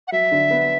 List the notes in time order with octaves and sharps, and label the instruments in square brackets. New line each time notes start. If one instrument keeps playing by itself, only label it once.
[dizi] F#5
[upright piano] F#3 [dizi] E5
[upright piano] D3
B3